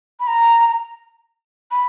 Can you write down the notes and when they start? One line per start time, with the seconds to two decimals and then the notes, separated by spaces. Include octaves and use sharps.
0.20 B5
0.27 A#5
1.71 B5